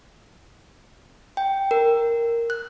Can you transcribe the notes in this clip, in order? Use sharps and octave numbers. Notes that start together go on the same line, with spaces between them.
G5
A#4
F#6